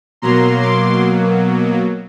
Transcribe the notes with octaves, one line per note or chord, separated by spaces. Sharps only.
B2 F#3 A#3 A#5 C6
C6 D6